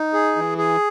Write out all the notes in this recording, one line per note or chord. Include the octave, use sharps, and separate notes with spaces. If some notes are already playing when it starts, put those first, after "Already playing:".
Already playing: D#4
G#4
E3
G#4